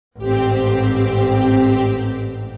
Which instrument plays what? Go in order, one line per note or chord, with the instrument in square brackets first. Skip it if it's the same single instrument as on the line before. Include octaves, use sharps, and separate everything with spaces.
[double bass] A1 G#2 [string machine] C4 G4